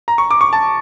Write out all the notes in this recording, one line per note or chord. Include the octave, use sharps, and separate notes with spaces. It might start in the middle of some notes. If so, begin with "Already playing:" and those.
A#5
C#6
D6
C#6
A5